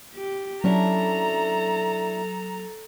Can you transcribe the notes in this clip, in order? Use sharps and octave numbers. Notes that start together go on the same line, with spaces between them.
G4
F#3 C#4 D4 E4 A4 A#5